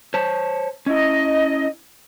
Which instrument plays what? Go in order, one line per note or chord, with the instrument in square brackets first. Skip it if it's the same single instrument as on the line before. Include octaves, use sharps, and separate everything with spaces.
[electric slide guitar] C5 C#5 A5
[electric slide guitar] C#4 E4 [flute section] D#5